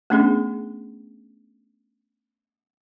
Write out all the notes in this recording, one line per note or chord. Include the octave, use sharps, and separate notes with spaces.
A3 B3 C#4 D4 G#4